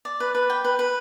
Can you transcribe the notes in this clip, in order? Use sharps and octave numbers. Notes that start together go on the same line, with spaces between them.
D5
B4
B4
G5
B4
B4